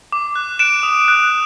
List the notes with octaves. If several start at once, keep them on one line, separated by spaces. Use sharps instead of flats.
D6
F#6
F#6 D7 E7
D#6
F#6